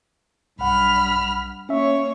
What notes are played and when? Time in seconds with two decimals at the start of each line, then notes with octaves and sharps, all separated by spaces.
0.59 B1 G2 F#5 B5 F6
1.69 A#3 C#4 C#5 E5